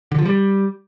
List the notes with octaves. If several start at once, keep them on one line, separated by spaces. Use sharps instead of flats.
D3
F3
G3